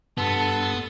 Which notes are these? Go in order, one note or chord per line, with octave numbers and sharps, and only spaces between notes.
G2 B3 A4 C6 E6